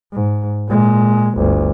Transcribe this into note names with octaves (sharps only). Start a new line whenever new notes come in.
G#2
A#2 G#3
G1 D2